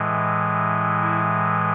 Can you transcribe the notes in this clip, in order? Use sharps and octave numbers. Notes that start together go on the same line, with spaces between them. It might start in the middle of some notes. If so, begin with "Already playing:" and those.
Already playing: A2 E3 G#3
E4